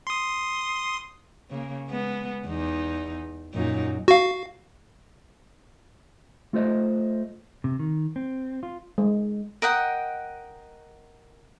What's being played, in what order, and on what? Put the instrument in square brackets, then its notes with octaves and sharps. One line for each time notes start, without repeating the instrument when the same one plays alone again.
[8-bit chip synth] C6 D#6
[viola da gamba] C#3 A#3
G#3 B3
E2 D#4
F#2 A#2 D#4
[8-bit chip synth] F#4 F5
[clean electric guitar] A3 F4 A4 C5 D#5
[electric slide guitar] C3
D#3
C4
F4
[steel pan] G#3
[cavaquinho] A#4 D#5 F#5 G5